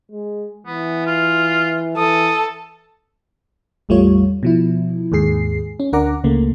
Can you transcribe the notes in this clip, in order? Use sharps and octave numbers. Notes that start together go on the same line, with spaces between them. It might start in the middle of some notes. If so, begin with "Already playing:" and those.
G#3
E3 B3
F4
E3 A4 D#6
A1 E2 G3 A3 F4 C#5
B2 F3 E4
D#2 G#2 G#4 C7
C#4
D2 D4 A#4 F#5 A#5 D6
C#2 C#3 A3 A#3